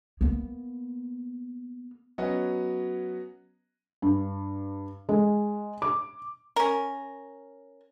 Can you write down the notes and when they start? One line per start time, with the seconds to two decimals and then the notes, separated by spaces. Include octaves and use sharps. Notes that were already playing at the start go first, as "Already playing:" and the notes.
0.21 A#3 B3
2.18 F#3 B3 C#4 F#4 D#5
4.02 G2
5.09 G#3
5.82 D6
6.56 C#4 A#4